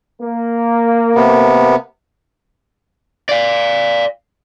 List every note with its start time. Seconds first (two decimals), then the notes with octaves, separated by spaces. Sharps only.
0.21 A#3
1.15 C3 B3
3.29 D5 F5